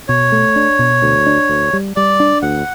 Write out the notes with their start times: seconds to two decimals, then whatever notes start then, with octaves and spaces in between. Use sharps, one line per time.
0.08 B2 C#5
0.32 A3
0.56 D4
0.79 B2
1.02 D2
1.26 D4
1.49 D2
1.73 G3
1.96 G3 D5
2.20 D4
2.43 D2 F#5